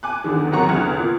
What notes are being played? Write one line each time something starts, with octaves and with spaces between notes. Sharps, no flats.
G#5 D6 F#6
E2 D3 D#3
C3 F#3 A#3 F#5 A#5 C#6
A1 E2 D3 F6 F#6 G#6
A#2